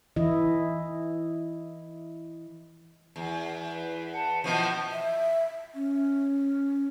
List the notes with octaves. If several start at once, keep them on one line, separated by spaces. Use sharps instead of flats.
E3 E4 D#5
E2
B4
B4 F#5 A5
B2 E3 F3 D#5 C#6 G6
E5
C#4